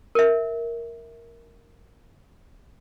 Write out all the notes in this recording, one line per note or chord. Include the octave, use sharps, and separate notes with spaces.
A#4 E5